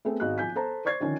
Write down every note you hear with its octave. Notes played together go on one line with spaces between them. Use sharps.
A3 B3 C4 G#4 A4
G#1 F#4 G#4 D#5 F#6
F3 G#5 G6 B6
A4 C5 A5 A#5
C5 D5 C#6 G#6 A6 C7
D3 D#3 F3 C#4 C#5